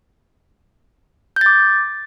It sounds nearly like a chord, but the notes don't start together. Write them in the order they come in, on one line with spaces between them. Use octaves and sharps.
G6 A6 D6